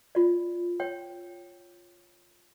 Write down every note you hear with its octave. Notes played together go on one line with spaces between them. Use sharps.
F4 D5
C#5 G5